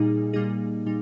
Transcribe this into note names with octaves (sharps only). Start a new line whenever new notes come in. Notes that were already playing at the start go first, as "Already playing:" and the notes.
Already playing: A#2 G3 A#3 D#4 G#4
A#2 G3 A#3 D#4 G#4
A#2 G3 D#4